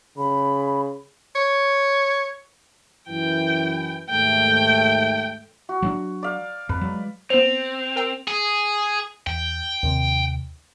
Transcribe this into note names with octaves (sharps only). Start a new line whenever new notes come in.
C#3 B5
C#5
F#2 E3 G5
D#2 G#2 A3 G5
F#4
F#3 C4 D4
D5 F5
F2 B4
F#3 G#3
B3 C4 C5 F7
A#4 G5 E6
G#4
E2 G5
D#2 C3